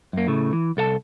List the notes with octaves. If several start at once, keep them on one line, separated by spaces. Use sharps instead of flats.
F#2 A#3
A2 C#3 A3
E3
C2 A4 F5 A5